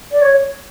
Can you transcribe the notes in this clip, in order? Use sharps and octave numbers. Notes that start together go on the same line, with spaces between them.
D5
C#5